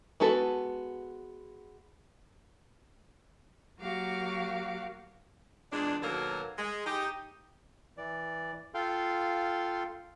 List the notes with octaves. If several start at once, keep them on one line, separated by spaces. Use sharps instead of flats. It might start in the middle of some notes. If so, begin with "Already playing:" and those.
G#3 B3 F#4 A4 B4
F#3 A#3 F#4 G4 F5 D6
E2 A#2 G#3 D4
D#2 B2 F#3 A#3 A4 A#4
G#3
D#4 G4
E3 D5
F4 A4 F5 G5 C6